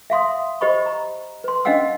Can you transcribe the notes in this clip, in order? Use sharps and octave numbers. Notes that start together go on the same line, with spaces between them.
E5 F5 C6 D#6
G4 C5 D#5 B5 C#6
A#5
B4 C6
C#4 D4 D#5 F5 F#5 E6